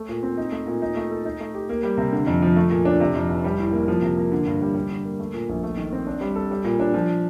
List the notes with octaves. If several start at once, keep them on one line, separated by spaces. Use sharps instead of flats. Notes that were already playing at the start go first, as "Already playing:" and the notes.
Already playing: A3
A#2
C4
D#4
A3
A#2
D#4
A3
A4
D#4
A3
G4
A#3
G3
C3
D3
F2
F3
A3
A#2
D4
C3
F2
F1
G3
A2
A#3
F3
C3
A#3
D3
G2
G3
G3
D3
A#3
A3
A#2
A#1
A3
D#3
C4
D4
G3
A4
G3
A#2
D4
F3